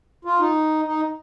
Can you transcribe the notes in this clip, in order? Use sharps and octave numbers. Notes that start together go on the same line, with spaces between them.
F4
D#4
D#4